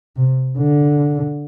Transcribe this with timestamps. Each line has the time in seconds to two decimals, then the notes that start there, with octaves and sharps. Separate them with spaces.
0.16 C3
0.58 D3